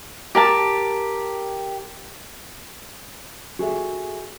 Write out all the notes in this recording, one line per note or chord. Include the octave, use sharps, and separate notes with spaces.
G4 A#4 A5
F#4 G#4 A4 E5